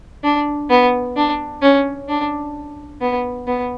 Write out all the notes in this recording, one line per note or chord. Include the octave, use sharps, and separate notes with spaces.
D4
B3
D4
C#4
D4
B3
B3